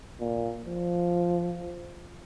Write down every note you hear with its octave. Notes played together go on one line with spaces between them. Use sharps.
A#2
F3